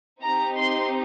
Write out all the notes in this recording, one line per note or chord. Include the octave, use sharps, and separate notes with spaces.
C4 D#4 G4 A#5
C6